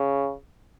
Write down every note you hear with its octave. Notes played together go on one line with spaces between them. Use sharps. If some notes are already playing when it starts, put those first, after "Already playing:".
Already playing: C#3